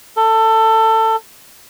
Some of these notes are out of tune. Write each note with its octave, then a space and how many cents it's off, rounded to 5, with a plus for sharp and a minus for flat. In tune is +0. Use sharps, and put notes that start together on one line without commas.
A4 +20